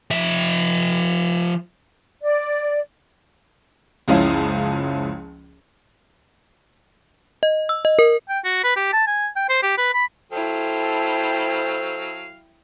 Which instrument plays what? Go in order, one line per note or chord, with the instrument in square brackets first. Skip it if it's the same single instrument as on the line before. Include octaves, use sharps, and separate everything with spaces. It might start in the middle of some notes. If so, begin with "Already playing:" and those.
[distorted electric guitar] F3 E5
[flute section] D5
[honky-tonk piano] F#1 C#2 F3 C#4 E4 F5
[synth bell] D#5
E6
D#5
A#4
[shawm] G5
F#4
B4
G4
A5
G#5
G5
C5
G4
B4
B5
[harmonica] F#3 F5 [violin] E4 G5 [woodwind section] A4 C5